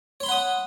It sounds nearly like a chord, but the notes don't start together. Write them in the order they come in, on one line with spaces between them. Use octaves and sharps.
C#5 C6 B5 F#5 D#6